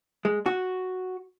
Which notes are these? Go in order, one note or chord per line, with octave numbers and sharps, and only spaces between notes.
G#3
F#4